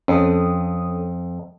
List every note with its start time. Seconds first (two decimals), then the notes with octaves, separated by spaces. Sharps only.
0.08 F2 C#4 A4 D#6